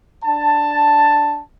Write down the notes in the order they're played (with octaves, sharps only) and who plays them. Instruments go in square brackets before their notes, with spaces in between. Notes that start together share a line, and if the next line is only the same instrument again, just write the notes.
[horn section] D4 A5